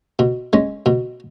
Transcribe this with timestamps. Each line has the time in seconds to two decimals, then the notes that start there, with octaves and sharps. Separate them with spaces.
0.19 B2
0.53 G#3 C#4
0.86 B2